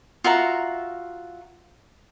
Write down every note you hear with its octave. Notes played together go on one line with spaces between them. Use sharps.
F4 F#4 E5 A#5